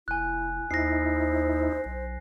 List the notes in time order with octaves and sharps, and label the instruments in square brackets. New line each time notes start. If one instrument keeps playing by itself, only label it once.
[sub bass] F1 [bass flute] E4 [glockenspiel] G#5 F#6
[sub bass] D#2 [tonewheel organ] D#4 E4 [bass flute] C5 [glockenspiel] A#6 C7
[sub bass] B1 [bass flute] C5